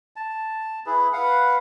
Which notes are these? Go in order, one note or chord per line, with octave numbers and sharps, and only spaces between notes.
A5
E4 G#4 B4
B4 F5 F#5